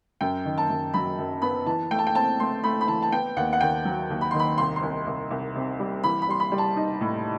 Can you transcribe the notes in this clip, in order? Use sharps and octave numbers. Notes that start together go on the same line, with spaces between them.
F#2 G5
D#3
A5
F#2
F#3 B5
F#2
B3 B5
E3 A5
A3 G5
A5
G5
C4 A5
A3 C6
A3 B5
B5
E3 A5
A5
B3 G5
D#2 F#5
F#5
D#2 G5
F#3
D#2
B5
D#3 C6
B5
C2 C6
C6
C2
C2
C2
C3
G3
E3 B5
B5
G3 C6
B5
G3
A5
D#4
A2